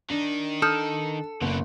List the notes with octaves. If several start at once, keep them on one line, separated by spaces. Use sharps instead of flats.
D#3 D4 D#4
A4 D#6 F6 G6
F#1 B2 D3